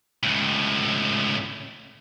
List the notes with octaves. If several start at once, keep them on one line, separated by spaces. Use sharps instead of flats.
C#2 A2